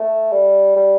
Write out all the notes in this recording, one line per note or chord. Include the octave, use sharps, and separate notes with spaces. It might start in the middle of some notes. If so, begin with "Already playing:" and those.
Already playing: A3
G3
G3